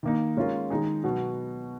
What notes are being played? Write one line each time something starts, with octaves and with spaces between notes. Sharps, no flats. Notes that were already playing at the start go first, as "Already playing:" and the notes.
D#3 A#3 D#4
G#3 C#4 F4 A#4
D#3 G#3 D#4 G#4
B2 F#3 B3 F#4